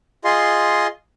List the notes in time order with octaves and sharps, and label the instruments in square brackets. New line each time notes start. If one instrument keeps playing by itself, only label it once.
[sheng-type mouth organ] F4 G#4 D#5 C6